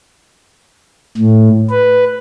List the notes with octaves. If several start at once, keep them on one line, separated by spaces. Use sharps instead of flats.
A2
B4